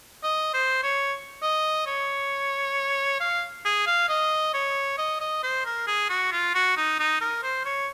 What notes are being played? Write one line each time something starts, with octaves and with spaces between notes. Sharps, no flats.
D#5
C5
C#5
D#5
C#5
F5
G#4
F5
D#5
C#5
D#5
D#5
C5
A#4
G#4
F#4
F4
F#4
D#4
D#4
A#4
C5
C#5